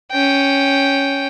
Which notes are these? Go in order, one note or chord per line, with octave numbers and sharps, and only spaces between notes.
C#4 G5